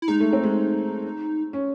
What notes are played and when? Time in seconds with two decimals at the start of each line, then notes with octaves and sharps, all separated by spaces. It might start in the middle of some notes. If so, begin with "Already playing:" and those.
0.02 E4
0.08 G#3 D#4
0.20 A3
0.33 C4
0.44 G#3
1.53 C#4